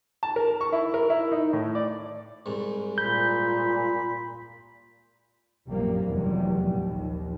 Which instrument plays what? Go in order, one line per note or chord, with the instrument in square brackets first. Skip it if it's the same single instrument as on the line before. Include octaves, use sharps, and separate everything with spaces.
[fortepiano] A5
A#4
C#6
E4
A#4
E4
D#4
A2
D5
[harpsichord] C2 G#2
[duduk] A#2 [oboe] B5 [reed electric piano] G6
[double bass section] A#1 F#2 C3 G3 A#3
F1 E2 C3 F#3 G3
A#1 D#2